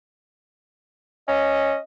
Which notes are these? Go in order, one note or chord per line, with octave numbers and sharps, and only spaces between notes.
C#4 D#5